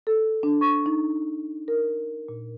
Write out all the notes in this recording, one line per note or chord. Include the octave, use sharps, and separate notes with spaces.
A4
D4
C#6
D#4
A#4
A#2